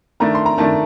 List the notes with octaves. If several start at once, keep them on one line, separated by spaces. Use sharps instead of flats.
D#3 A3 D4 A#5
C6
A#5
D#3 A3 D4 A5